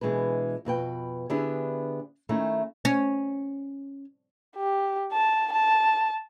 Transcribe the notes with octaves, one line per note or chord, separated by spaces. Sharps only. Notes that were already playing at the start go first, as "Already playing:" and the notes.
B2 E3 G#3 D4 B4
F2 B2 B4 G5
D3 B3 D4 E4 G4 G#4
D#3 A3 C#4 D#4 E4
C#4
G4
A5
A5